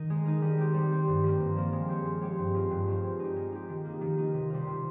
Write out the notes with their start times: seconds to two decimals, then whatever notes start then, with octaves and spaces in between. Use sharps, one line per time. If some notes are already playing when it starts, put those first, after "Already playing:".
Already playing: D#3 D#4
0.10 G#3
0.25 D#4 A#4
0.42 G3
0.58 C4 G4
0.74 G3
0.91 C4 G4
1.08 G2
1.24 F3 A#3
1.40 G2
1.56 F3 A#3
1.73 G#3
1.89 C4 G4 C#5
2.05 G#3
2.21 C4 G4 C#5
2.38 G2
2.54 F3 G#3 C4 F4
2.71 G2
2.87 F3 G#3 C4 F4
3.04 G#3
3.19 D#4 G4
3.36 G#3
3.52 D#4 G4
3.69 D#3
3.85 A#3 D#4
4.01 D#3
4.17 A#3 D#4
4.34 C3
4.50 G3 C4 F4
4.67 C3